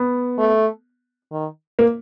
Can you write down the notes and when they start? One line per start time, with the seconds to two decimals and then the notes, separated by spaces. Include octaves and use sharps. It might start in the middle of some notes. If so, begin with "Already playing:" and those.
Already playing: B3
0.38 A3
1.32 D#3
1.79 A#3